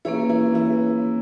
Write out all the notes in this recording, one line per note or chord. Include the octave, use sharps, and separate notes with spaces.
E3 A#3 C#4 E4 G#4 C#5
E3 E4
E3 E4